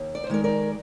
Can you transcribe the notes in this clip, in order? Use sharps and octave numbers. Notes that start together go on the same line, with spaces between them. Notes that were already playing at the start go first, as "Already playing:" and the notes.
Already playing: D#2
D5
C5
D#3 G#3 A#4 D5
A#4 D5